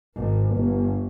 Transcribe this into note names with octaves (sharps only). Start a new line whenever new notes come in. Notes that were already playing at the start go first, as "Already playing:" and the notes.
G#1
G1